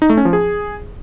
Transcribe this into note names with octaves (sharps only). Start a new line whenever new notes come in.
D#4
A3
C#4
F3
G#4